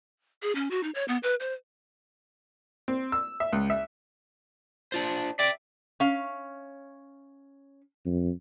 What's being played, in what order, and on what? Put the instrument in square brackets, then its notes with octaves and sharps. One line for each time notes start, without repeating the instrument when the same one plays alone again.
[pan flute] G#4
C#4
F#4
D#4
C#5
B3
B4
C5
[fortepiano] C4
E6
E5
C#2
E5
[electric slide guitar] D4 F4 C5
[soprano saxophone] D5 [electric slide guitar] E5 G5
[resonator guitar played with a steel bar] C#4 F5
[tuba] F2